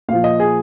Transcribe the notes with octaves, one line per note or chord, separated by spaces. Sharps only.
A#2 F3 F5
D#5
G#4